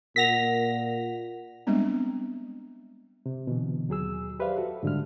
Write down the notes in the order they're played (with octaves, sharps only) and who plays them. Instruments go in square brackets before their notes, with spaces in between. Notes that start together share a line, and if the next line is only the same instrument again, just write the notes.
[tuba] A#2 [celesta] A#4 F#5 F7 [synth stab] A#6 B6
[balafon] G3 G#3 B3 C4 D4
[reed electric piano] C3
B2 D3 E3
D#2 F#3 G#4 E6
G4 B4 C5 D5 E5 F5
F#4 A4
G#2 D3 G3 G#3 F6